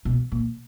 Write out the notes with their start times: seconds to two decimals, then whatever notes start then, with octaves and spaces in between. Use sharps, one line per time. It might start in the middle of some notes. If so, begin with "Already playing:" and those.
0.05 B2
0.32 A#2